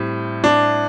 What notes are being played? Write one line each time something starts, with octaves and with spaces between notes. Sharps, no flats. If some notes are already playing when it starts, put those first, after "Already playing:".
Already playing: A2 G3 C4
D4